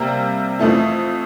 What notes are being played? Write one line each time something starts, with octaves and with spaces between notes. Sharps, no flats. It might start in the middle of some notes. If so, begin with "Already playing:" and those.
Already playing: C3 G3 A#3
F2 E3 A3 E4